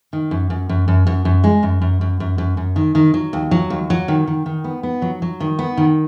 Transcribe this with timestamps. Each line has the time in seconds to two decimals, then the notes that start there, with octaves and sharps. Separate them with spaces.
0.13 D#3
0.31 F#2
0.50 F#2
0.69 F#2
0.88 F#2
1.07 F#2
1.25 F#2
1.44 G#3
1.63 F#2
1.82 F#2
2.01 F#2
2.20 F#2
2.38 F#2
2.57 F#2
2.76 D#3
2.95 D#3
3.14 F#3
3.33 D#2
3.51 F#3
3.70 D#2
3.90 F#3
4.08 D#3
4.27 D#3
4.46 D#3
4.64 B3
4.83 B3
5.02 F#3
5.22 F#3
5.40 D#3
5.59 B3
5.77 D#3